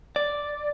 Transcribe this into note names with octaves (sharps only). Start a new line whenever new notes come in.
D5